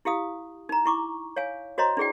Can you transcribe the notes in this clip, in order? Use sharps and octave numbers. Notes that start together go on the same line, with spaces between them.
E4 G4 F5 D#6
D#4 A#5
E4 C#6 D6
C#5 F5 G#5
F#4 C5 C#5 D#5 A#5 C6
D4 E4 G#4 D5 G5